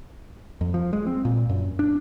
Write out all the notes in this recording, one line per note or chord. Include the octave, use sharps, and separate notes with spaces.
F2
F3
G#3
C4
A#2
F#2
D4